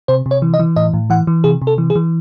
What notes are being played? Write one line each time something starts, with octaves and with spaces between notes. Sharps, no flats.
C3 C5
C3
C#5
E3
D#5
E3
A2 D#5
A2
E3 F#5
E3
C3 G#4
C3
A4
E3
G#4
E3